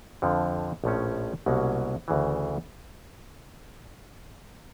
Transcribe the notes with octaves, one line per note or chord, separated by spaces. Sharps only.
F2 D3 F3
A#1 A2 F3 A3 C#4
C2 B2 F#3 A#3 C#4
D2 C#3 E3